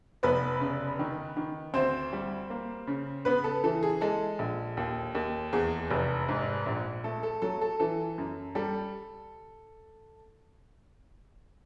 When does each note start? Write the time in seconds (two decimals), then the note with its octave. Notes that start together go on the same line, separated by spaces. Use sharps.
0.23 F1 B3 B4
0.60 C#3
0.99 D#3
1.37 D#3
1.74 D2 C4 C5
2.13 G3
2.50 A#3
2.87 C#3
3.25 C#3 B3 B4
3.44 A4
3.64 E3 A4
3.83 G#4
4.01 G#3 A4
4.39 A#1
4.77 D#2
5.15 D#2
5.53 E2 G#4
5.90 F1
6.28 G#2
6.66 A#1
7.04 A3 A4
7.23 A4
7.42 F#3 A4
7.61 A4
7.80 E3 A4
8.18 F#2
8.55 G3 A4